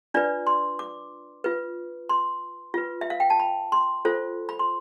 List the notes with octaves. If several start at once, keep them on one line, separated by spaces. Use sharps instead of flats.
D4 F4 B4 D5
C6
D6
F4 B4
C6
F4 B4
E5
F5
G5
A5
B5
C6
F4 A4 C5
B5
C6